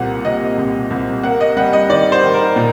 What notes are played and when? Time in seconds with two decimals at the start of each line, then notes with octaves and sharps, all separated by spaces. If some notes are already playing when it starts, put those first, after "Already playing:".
Already playing: C2 A#2 F#5
0.25 C3 D#5
0.58 C2
0.91 C2
1.23 A#3 F#5
1.41 D#5
1.57 G3 F#5
1.73 D#5
1.90 D#3 D5
2.12 C5
2.23 D#3
2.34 A#4
2.56 A#2